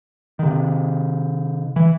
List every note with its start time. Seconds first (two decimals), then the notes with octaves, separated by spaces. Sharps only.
0.39 C3 D#3
1.76 E3